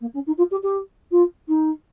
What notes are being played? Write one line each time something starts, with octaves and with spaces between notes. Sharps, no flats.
A#3
C#4
D#4
F4
G4
G4
F4
D#4